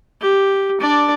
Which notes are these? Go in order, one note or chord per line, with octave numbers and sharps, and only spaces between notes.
G4
D4 D5